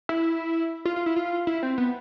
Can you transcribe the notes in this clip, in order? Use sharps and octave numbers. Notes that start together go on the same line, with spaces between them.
E4
F4
F4
E4
F4
E4
C4
B3